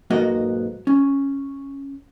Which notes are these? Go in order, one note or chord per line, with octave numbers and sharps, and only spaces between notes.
B1 G#2 A#3 B3 F#4 D#5
C#4